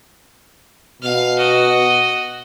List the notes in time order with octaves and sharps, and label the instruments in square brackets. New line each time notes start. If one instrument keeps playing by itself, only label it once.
[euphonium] B2 [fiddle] F5
[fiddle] F#4 D#5